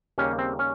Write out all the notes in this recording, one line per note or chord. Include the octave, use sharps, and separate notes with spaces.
D#2 C#3 G3 A#3 C#4
C4
C#4